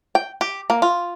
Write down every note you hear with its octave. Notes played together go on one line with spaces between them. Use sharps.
G5
G4
A#3
F4